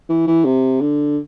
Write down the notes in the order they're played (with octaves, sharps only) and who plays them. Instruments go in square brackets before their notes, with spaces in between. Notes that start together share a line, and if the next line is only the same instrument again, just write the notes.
[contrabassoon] E3
E3
C3
D3